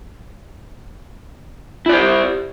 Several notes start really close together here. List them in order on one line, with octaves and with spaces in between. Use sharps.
E4 D5 C5 G4